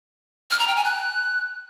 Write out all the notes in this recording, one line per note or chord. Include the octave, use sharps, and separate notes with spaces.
F6
A#5
G5
G#5
F#6